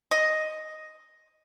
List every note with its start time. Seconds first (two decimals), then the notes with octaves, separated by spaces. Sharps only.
0.11 D#5